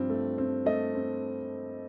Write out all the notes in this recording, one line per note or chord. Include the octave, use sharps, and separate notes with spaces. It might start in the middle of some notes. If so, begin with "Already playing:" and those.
Already playing: G2 F3 C4
A3
C4
A3 D#5
C4